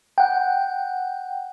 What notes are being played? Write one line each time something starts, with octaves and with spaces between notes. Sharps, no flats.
F#5 G5